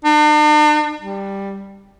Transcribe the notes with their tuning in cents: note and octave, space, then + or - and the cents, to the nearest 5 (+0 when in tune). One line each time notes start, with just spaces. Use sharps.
D4 +45
G3 +5